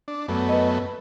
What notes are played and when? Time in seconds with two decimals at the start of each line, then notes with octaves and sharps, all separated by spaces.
0.08 D4
0.28 F#2 A3 B3
0.49 B4 D#5